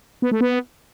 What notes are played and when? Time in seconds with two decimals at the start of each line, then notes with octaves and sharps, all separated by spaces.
0.22 B3
0.31 A3
0.41 B3